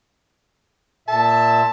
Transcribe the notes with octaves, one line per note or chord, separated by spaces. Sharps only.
A#2 E5 A5